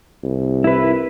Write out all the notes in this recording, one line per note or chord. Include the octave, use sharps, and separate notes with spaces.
C2
E4 B4